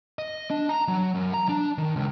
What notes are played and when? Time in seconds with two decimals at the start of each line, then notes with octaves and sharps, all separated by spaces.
0.19 D#5
0.50 D4
0.69 A#5
0.88 F#3
1.15 F#2
1.34 A#5
1.49 D4
1.78 D#3
1.96 C#2